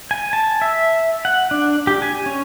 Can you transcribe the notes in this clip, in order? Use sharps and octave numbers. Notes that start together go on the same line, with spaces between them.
G#5
A5
E5
F#5
D4
G4
G#5
C#4